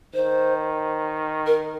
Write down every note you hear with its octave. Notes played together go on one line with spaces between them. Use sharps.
D#3 C5
A#4